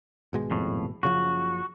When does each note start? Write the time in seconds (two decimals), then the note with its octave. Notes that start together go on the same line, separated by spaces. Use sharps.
0.33 G#1 B2 G#3
0.51 F2 A2
1.03 F#1 C#3 F3 F#4